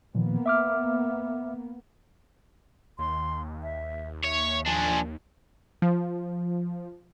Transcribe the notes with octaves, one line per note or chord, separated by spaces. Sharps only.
A#2 D#3 F3 A#3 B3
E5 D6 F6
D#2 C6
E5
C#5 E5
F3 D4 G#5
F3